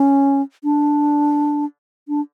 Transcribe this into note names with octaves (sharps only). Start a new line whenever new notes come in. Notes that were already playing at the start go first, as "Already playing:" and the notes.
Already playing: C#4
D4
D4